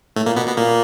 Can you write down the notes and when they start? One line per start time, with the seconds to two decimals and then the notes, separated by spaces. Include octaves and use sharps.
0.16 A2 A3
0.26 A#2 A#3
0.37 B2 B3
0.47 B2 B3
0.57 A#2 A#3